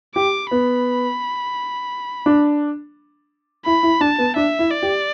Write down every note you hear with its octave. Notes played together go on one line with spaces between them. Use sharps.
G4 D6
B3 B5
D4
E4 B5
E4
D4 A5
B3
D4 E5
E4
D5
G4